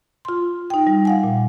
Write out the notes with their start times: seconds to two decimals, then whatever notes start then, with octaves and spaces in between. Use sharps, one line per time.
0.25 F4 C6
0.70 D#4 G5
0.87 G3
1.05 F5 F#5 G#5
1.24 A#2